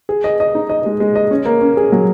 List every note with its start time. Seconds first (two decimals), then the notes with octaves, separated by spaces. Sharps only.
0.09 G#4
0.24 D#5
0.40 D#5
0.55 D#4
0.70 D#5
0.86 G#3
1.00 G#3
1.15 D#5
1.31 C#4
1.45 A#3
1.62 C#4
1.77 G#4
1.92 F#3